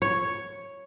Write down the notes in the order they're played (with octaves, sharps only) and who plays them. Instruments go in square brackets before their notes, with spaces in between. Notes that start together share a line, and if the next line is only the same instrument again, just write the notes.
[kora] C#5